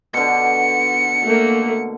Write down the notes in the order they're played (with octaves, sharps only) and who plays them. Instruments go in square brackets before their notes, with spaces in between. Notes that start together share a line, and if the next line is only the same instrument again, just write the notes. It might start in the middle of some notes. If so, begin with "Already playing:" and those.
[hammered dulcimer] B2 D3 [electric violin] C#7
[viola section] A3 A#3